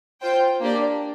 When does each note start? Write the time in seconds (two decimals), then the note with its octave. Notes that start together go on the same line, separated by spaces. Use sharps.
0.21 F4 C5 G5
0.60 A#3 D4 G4 D5